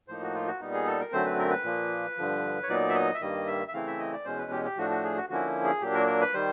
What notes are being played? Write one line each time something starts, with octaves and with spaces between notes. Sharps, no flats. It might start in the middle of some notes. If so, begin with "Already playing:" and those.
A2 F3 A#3 D#4 C5
F#4
F4
F#4
A#2 G3 B3 D#4
G#4
A4
A#4
F#2 D3 F#3 A3 C4 C5
B4
A#4
B4
A#2 F3 A#3
G2 D3 F3
C#5
A#2 F#3 B3 D#4 D5
E5
D#5
E5
G2 D#3 G3 A#3 D#5
E5
E5
C#3 E3 A3 C4 E4 F5
E5
D#5
D5
E2 B2 G#3 C#4 C5
B4
G4
G4
A2 F3 A3 D4 F#4
F#4
G#4
F#4
D3 F3 A#3 C#4 E4 F#4
G#4
A#2 F#3 A#3 D4 G4
A#4
A#4
B4
D#3 G3 C5